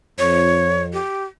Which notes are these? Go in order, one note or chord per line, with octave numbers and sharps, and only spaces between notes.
F2 C#5
G4